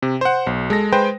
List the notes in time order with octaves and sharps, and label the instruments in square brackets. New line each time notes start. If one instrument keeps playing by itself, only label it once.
[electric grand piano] C3
C5 F#5
B1
G#3 A4 A#6
G#3 B4 C5 G5